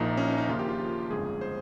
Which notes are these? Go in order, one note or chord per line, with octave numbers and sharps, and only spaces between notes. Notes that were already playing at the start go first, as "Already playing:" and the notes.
Already playing: A#1 A#2 F3 A#3 D#4
C#4
D#4
D#4
D#2 C#3 F3 A#3 F4
G4
F4
G1 F2 C#3 G#3 G#4
C5